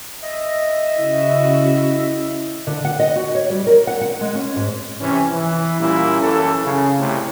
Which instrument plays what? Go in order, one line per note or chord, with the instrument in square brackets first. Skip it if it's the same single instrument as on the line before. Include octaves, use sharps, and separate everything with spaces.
[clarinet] D#5 [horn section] E5
[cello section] C#3 F#4 [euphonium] E4
[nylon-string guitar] D3
F#5
D#5
F#4
C#5
G3
A#4
F#5
F#5
G#3
C#4
G#2
[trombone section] C3 E3 C#4
E3
A#2 G3 A#3 C#4 E4
F#2 E3 A4
C#3
C2 A2